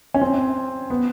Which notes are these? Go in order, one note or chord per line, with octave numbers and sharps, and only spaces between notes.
C#4
C4
B3